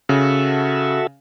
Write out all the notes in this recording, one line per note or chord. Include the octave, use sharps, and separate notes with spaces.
C#3 F#4 A4 E5